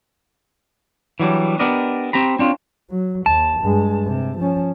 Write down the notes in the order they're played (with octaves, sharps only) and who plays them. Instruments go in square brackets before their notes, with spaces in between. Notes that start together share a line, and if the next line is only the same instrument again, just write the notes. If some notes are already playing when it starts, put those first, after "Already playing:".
[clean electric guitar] E3 F#3 G3 D4
B3 D4 G4 A#4 D5 D#5
C4 G4 A#5 B5
C4 D4 F4 C#5
[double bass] F#3
[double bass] D#2 [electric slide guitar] A5
[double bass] G2 G#3
C3
F3 C#4